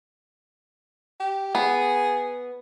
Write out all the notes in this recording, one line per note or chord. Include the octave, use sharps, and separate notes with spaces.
G4
B3 G#4